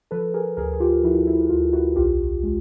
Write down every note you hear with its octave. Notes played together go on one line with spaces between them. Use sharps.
F3 A4 B4
G#4 A#4
D2 G#4 A#4
G#4
F4 G4
F3 E4 F#4
E4
D2 F4
E4 F#4
B1 F4 G4
G#3